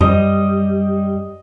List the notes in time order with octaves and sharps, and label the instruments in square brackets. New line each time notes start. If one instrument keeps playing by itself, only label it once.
[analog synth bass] F#2 [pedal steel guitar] G3 [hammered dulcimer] D#5